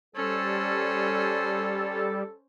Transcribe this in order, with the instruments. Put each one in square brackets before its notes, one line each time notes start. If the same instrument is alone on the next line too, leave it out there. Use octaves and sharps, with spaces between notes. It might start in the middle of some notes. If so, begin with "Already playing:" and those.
[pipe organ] G3 [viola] C#4 C5 [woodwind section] A4